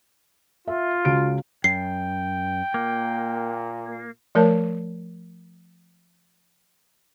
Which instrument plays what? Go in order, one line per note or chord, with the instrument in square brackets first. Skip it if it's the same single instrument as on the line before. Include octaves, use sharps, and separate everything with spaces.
[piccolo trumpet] F4 [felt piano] E5
[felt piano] C#2 F#4 D7
[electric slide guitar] F#2 [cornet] G5 [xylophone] C7
[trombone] A#2 [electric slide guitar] A#3
[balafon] F3 A3 A#4 C#5 A5